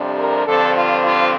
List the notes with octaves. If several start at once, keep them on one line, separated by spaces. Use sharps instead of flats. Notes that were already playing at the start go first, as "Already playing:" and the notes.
Already playing: F2 C3 G3 D4
A#4
G2 D3 F3 C4 A4
F4
F4